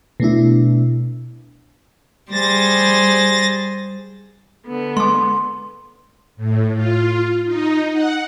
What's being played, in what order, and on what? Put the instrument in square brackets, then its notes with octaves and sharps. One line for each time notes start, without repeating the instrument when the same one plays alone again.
[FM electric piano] B2 A3 D4 E4
[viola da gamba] G3 [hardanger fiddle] G#4 C5 [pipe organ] A6 A#6
[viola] D3 B3
[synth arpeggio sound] G#3 D6 [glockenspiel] C6
[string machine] A2
F4
D#4
F#5